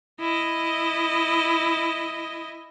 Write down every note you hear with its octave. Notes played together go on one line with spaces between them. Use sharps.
E4 D#5